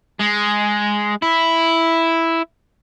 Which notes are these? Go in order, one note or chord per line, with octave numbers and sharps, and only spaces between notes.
G#3
E4